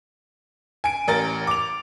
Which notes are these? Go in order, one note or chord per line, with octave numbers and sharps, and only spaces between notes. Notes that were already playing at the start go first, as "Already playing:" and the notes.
G#5 D7
A1 A#4 A6
D6 F7